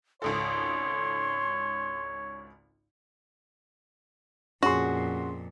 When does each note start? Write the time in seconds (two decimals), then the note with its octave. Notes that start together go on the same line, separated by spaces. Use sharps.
0.22 G#1 C#2 A4 C#5 C6
4.63 F2 A#2 C#4 F#4 G#4 C6